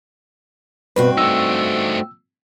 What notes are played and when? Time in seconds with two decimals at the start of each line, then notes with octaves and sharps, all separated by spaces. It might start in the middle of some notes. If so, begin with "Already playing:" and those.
0.96 G2 B2 C4 F#4 B4
1.18 A3 D#4 E6